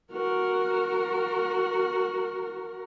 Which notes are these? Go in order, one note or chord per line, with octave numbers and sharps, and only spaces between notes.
F#4 A#4